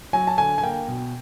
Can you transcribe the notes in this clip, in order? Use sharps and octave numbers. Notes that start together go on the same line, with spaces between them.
F#3 G#5
A5
D3 G#5
G#5
A#3 G5
B2